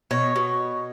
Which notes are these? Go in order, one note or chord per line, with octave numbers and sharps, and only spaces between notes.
B2 C#5
B2